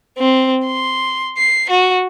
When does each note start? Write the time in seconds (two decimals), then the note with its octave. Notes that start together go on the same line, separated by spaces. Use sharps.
0.18 C4
0.66 C6
1.37 C7
1.70 F#4